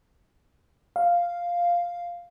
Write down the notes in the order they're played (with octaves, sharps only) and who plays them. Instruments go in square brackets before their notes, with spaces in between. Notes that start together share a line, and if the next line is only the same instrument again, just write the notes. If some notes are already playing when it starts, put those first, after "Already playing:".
[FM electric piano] F5